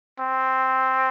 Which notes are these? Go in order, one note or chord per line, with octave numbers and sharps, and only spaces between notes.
C4